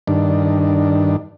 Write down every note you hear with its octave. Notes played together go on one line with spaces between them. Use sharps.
G2 D#3 D4